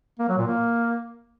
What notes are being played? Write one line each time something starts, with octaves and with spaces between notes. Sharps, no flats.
A#3
F#3
A#2
A#3